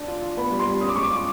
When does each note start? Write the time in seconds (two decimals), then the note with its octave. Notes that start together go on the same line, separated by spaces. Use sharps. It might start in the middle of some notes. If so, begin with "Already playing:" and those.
Already playing: D4
0.08 F4
0.22 F4
0.37 B3 B5
0.51 G3
0.59 C6
0.67 G3
0.81 C#4 D#6
0.89 D6
0.96 G#3 C#6
1.03 D6
1.10 F4